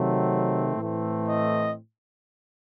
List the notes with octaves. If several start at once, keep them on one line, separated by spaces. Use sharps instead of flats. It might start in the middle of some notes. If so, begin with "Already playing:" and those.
Already playing: C3 D#3 F#3 A3 C4
A2 E3 A3 C4
D#5